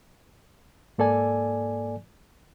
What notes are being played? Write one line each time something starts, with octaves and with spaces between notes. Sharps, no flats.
G#2 A#3 A4 D5 G#5